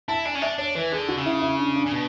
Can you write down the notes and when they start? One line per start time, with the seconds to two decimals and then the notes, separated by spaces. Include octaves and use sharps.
0.08 E4 A5
0.25 D4 G#5
0.35 C#4
0.42 D4 E5
0.58 D4 C#5
0.75 E3 B4
0.92 D3 G#4
1.08 F#4
1.17 C#3
1.26 E4
1.42 E4
1.58 D4
1.75 D4
1.86 C#3
1.93 B2